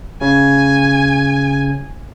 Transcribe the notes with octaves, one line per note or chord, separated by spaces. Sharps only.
C#3 G#5